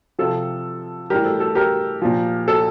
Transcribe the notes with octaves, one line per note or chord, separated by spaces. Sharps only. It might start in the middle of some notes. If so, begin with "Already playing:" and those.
C3 F3 A4
A2 E3 G3 G4 A#4
A4
A4
G4 A#4
A#2 F3
A4